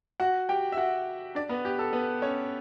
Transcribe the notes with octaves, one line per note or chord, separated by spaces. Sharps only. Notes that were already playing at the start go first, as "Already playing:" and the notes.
F#4 F#5
G4 G5
E5
F#4 F#5
D4 D5
B3 B4
G4
A4
B3 B4
C#4 C#5